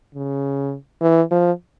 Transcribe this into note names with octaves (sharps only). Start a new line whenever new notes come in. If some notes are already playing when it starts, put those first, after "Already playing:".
C#3
E3
F3